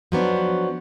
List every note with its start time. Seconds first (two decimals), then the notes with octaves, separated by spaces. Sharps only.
0.12 F3 F#3 B3 D4